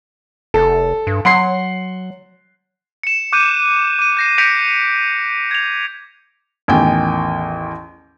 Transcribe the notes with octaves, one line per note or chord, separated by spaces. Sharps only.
F1 A4
G2
F#3 F#5 C6 C7
C#7 E7
D6 F#6 G6 D#7
D6 D#7
G6 A#6 C7
G6 A#6 B6 C#7 D7 F7
G#6 F7
A1 E2 D#3 G5 G#5